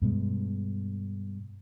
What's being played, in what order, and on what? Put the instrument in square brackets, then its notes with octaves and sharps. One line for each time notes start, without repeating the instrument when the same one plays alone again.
[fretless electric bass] G2 B2 G#3